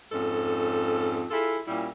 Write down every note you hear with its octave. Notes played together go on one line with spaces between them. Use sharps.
F2 G#2 C#4 A4
E4 F4 G#4 A4
A#2 G3 C#4 E4